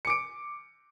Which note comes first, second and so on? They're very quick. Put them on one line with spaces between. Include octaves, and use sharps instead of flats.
C#7 D6 D7